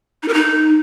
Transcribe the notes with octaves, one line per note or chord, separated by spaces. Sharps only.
D#4
A#4
D#4